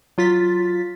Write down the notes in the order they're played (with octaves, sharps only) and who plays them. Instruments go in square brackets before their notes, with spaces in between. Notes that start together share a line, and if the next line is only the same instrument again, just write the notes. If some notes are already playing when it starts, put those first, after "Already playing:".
[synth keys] F#3 F4 A6 B6